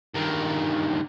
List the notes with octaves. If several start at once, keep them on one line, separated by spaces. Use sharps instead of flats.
G2 D#3